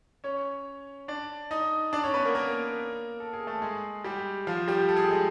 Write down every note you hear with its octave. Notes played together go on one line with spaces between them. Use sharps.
C#4 C#5
D4 D5
D#4 D#5
D4 D5
C#4 C#5
B3 B4
A#3 A#4
A#3 A#4
A4
G#4
A3 A4
G#3 G#4
G3 G4
F3 F4
G3 G4
A4
G#4
G4
G#3 G#4